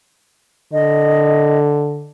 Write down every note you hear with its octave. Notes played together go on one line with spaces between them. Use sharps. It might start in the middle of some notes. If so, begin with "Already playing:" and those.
D3 D#5